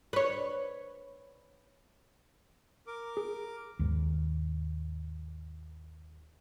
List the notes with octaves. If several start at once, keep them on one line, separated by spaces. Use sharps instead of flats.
B4 C#5
A#4 D6
G#4
D#2 G#2